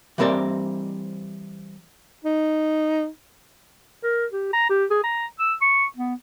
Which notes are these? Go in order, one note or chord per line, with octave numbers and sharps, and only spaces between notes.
E3 G3 C4 A#4 D5
D#4
A#4
G4
A#5
G4
G#4
A#5
E6
C#6
B3